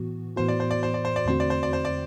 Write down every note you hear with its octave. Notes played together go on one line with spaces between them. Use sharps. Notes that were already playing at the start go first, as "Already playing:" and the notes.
Already playing: A2 E3 B3 F#4
A2 E3 B3 F#4 C5
D5
C5
D5
C5
D5
C5
D5
E2 D3 A3 C4 F#4 C5
D5
C5
D5
C5
D5